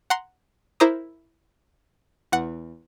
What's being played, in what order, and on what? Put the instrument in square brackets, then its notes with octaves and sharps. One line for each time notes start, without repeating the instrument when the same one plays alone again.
[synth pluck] F#5 A#5 C6
E4 A#4 C5 A#5 D6 D#6
E2 F#5